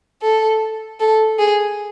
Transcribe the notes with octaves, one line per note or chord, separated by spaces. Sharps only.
A4
A4
G#4